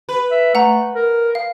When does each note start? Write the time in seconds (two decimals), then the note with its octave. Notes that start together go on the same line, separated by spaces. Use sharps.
0.09 B4
0.31 E5
0.55 A3 F#5 A#5
0.95 A#4
1.35 F5